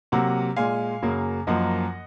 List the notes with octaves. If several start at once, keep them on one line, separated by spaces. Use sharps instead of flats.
C3 F#3 A#3 F#5 A#5
A#2 G#3 F5 G#5
F#2 C#3 F#3 A#3
F#2 F3 A#3 D#5 F#5